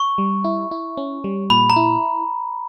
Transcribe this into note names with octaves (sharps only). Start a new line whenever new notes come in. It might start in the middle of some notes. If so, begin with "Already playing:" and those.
Already playing: C#6
G3
E4
E4
C#4
G3
A#2 B5
A#5
E4